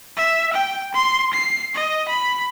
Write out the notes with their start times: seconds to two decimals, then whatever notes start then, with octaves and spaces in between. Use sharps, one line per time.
0.17 E5
0.53 G5
0.94 C6
1.33 C7
1.74 D#5
2.08 B5